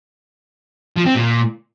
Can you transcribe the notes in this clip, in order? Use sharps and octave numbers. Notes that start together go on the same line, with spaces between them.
F3
C4
A#2